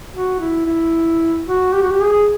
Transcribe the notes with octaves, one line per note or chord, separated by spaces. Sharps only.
F#4
E4
E4
F#4
G4
F#4
G4
G#4